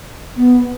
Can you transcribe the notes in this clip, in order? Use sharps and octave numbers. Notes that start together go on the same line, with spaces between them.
B3